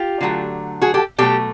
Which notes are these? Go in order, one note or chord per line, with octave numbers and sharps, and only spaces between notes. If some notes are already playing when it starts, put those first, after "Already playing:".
Already playing: F4 G4
D3 F#3 A3
F#4 G#4
G4 A4
B2 F#3 A3 G4 A4